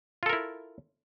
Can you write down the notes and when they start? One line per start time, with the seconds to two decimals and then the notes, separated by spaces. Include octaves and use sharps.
0.23 F4
0.26 A4
0.29 A#4
0.33 E4